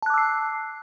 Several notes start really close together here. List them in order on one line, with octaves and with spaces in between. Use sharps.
A5 F#6 D6 E6 C7